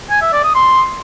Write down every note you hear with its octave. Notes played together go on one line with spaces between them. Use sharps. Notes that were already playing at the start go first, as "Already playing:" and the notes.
G#5
E5
D5
D#6
C6